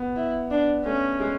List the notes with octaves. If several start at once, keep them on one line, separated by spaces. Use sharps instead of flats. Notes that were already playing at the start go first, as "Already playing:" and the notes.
Already playing: B3
E4
D4
A3 C#4
G#3